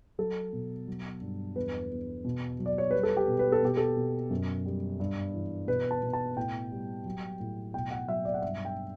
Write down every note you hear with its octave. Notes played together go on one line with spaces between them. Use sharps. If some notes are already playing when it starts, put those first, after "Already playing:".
F#3 A4
B2
F#3
G2
E2 B4
E2
B2
F#3
D5
C#5
G3 B4
A4
G4
B2
B4
A4
B2 G4
A4
B2
F#2
G3
G2
E3
B2 B4
A5
B2
A5
A2 G5
G3
F#3
A2
B2 G5
F#5
F#3 E5
D5
F#5
G2 E5
G5